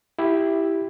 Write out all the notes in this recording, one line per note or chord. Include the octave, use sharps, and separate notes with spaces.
E4 G4